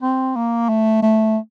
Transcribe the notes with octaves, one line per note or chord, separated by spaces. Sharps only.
C4
A#3
A3
A3